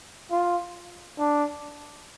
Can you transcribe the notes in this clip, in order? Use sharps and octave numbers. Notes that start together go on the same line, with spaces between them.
F4
D4